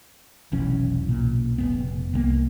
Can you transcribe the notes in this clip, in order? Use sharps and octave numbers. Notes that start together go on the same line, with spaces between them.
F1 B1 E3 C#4
B1 A#2
F1 F#2 B3
C2 G#3 A#3